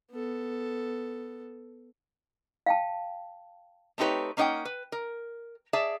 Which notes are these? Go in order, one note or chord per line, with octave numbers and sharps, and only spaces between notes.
B3 A4
F5 G5 A5
A3 C4 D#4 G4 B4 C#5
A#3 C#4 D#4 D5 F#5 G5
B4
A#4
G#4 D5 E5 A5